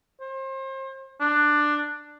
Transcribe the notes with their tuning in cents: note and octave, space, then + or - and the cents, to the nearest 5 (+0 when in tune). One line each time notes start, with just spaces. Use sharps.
C5 +35
D4 +10